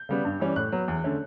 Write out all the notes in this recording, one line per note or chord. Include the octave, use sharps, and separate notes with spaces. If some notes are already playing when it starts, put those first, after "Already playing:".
Already playing: G6
C#3 G3 B3
G2
E3 G3 C#4
A2 F#6
F#3 B3
E2
D3 A3 C#4